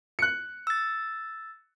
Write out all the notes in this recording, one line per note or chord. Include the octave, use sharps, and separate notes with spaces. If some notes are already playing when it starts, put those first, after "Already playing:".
F#6 C#7
E6 A6